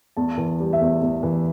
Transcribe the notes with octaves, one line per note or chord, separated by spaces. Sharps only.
E2 A5
E3
G3
E5
E2
E2
E3